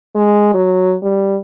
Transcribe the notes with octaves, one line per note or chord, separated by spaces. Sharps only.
G#3
F#3
G3